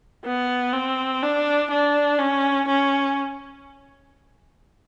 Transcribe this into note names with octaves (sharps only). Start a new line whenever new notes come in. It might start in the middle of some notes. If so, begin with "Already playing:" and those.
B3
C4
D4
D4
C#4
C#4